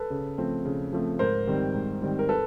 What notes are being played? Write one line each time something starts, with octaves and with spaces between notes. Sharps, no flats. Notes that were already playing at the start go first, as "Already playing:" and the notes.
Already playing: A4 B4
C#3
F3 A3 C4
C#3
F3 A3 C4
G#2 A#4 C5
D#3 G3 C4
G#2
D#3 G3 C4
A#4
A4 B4